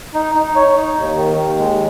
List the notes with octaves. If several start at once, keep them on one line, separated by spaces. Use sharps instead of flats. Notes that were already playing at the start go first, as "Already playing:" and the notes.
D#4
D#4
C#5
D#4
D#2
D#3
D#2
G#3